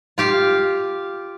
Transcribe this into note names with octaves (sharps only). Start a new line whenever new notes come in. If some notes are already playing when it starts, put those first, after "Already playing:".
F4 G4 F5